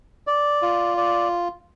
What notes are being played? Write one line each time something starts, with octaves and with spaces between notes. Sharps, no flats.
D5
F4
D5